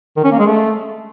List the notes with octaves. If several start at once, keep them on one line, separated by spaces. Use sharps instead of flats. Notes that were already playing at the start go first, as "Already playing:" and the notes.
D#3
C#4
A#3
G#3
A3